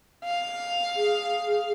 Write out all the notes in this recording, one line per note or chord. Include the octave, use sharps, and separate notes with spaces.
F5
G#4